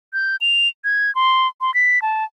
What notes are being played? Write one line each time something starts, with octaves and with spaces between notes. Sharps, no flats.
G6
F7
G#6
C6
C6
B6
A5